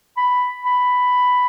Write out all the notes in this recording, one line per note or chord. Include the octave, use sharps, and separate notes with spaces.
B5
B5